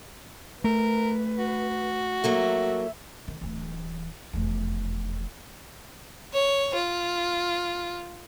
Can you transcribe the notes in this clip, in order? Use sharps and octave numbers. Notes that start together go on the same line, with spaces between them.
A3 A#4 B4
F#4
F#3 A#3 A4 E5
D#3
D1 E3
F1 E2
C#5
F4